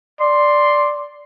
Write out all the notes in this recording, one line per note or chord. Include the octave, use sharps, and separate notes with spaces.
D5 C6